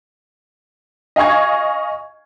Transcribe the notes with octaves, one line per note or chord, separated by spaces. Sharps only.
D#5 F5 G#5 C#6 G#6